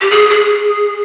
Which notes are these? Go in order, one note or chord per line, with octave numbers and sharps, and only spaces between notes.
G4
G#4
G#4